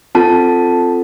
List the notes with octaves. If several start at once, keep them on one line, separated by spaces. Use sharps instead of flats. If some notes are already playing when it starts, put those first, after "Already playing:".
C4 F4 A4 A5